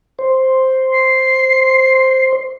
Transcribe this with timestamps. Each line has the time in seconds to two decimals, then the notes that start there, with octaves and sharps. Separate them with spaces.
0.19 C5
0.92 C7